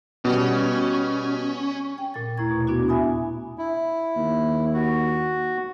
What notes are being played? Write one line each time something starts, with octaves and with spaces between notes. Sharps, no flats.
B2 G3 C#4
G5
A#2 A6
D#2 A3 E4 A#5 C#6 G#6
B2
B3 D4 E4 F#4
E5 G#5 B5 D#6
E4
D#2
F#4